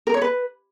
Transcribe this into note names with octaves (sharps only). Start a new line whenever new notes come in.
A#4
C#5
B4